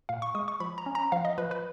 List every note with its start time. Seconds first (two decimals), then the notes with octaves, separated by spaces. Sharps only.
0.09 A#2 F5
0.22 C#6
0.35 G#3 D#6
0.48 C#6
0.60 F3 B5
0.78 A#5
0.86 C#4
0.95 A#5
1.12 F3 F5
1.25 D#5
1.38 F3 B4
1.51 B4